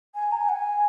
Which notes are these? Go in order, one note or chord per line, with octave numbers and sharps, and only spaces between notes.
G#5
A#5
G#5
F#5
G#5